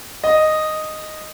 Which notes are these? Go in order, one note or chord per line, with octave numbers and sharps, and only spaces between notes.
D#5